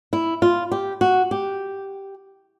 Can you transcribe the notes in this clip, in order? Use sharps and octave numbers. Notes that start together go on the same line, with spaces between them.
E4
F4
G4
F#4
G4